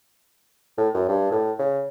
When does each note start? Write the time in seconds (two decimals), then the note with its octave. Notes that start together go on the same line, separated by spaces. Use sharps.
0.77 A2
0.94 F#2
1.09 G2
1.32 A2
1.59 C#3